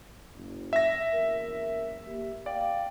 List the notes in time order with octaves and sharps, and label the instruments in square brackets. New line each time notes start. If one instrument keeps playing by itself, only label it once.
[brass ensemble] F#1
[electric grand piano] E5 A#6
[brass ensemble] F#1 E2 A#4
A#3 G4
[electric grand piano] D5 [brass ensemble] F5 G5